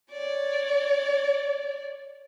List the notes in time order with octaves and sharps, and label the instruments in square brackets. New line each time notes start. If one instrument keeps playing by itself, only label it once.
[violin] C#5 D5